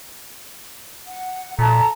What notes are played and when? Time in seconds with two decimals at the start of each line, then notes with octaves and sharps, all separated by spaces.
1.07 F#5
1.59 A#2 A4 A5 A#5